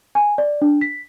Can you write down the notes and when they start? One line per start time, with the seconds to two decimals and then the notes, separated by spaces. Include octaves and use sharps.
0.15 G#5
0.38 D5
0.62 D4
0.81 B6